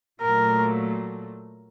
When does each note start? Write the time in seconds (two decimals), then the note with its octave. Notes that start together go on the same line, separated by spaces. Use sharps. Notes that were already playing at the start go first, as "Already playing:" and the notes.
0.22 A#2 F#3 A3 A#4